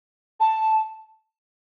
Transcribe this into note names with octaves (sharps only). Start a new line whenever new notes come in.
A5